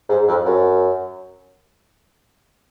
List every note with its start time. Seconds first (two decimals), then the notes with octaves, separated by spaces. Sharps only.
0.09 G#2
0.28 F2
0.45 F#2